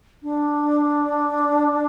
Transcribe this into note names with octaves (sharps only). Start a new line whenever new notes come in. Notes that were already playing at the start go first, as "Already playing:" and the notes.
D4